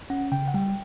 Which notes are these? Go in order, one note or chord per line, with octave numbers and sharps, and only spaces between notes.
C#4 F#5
C#3 G5
F#5
G3 G5